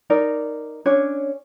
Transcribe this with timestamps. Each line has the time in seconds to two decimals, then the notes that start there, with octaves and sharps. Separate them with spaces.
0.10 D#4 A#4 D5
0.86 C#4 D4 C#5